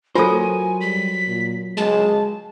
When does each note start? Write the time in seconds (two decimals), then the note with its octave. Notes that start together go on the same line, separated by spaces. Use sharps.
0.15 F#3 F4 A4 A#4 C5 G#5
0.81 G3 B6
1.27 A#2
1.77 G#3 A5